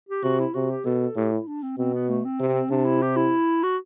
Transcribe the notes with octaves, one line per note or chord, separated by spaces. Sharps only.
G4
C3 F#4
E4
C3 F#4
G4
B2 A4
A2 G4
E4
D4
C4
B2 C4
B3
A3
C4
C3
C3 D4
E4
G4
E4
F#4